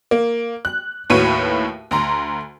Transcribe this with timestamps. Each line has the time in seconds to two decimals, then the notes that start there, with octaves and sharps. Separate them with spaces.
0.11 A#3
0.65 F#6
1.10 D#2 A2 F#4 B4 C#5 D#7
1.91 D2 A#5 C6